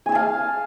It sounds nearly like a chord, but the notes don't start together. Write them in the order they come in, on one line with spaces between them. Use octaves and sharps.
G#5 E6 A5 F5